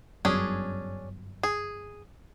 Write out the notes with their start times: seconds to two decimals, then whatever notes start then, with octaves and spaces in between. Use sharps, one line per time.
0.25 G1 F#2 C#4 D4 G#4
1.43 G#4